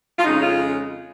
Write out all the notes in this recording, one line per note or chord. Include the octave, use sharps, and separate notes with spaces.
F4
F2 C#3 G#3 C#4 D#4
C#4 F4